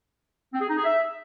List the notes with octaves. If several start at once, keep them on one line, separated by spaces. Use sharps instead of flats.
C4
G#4
D#4
G#4
E5